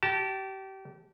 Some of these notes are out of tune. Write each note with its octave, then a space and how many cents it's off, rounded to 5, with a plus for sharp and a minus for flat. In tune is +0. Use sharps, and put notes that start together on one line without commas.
G4 -30 A5 +0